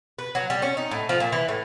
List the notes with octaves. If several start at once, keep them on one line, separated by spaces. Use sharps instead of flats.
B4
F#3
G3
C#4
D#4
A2
F3
A#2
E3
A2